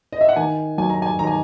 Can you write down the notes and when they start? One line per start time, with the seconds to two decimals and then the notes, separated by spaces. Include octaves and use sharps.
0.13 D#5
0.21 E5
0.29 F#5
0.36 D#3 G#5
0.78 F#3 G#5
0.89 A#5
1.02 G#5
1.19 D#3 A#5
1.27 G#5